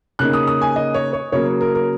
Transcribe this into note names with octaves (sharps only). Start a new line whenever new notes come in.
C#3 A#3 D#4 F#6
D#6
D#6
G#5
D#5
C#5
C#5
C#3 F#3 A#3 C#5
A#4
A#4